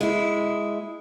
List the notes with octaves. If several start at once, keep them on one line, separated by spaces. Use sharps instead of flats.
G#3 E4